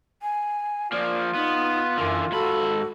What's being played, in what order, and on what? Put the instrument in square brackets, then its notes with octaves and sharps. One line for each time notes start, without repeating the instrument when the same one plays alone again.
[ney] G#5
[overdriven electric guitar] F3 A#3 [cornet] F4 [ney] D5
[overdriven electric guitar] B3 [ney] D#4
[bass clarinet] F#2 [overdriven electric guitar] D3 E3 [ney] A#4
[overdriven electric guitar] G#2 B5 [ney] F#4 [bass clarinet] A4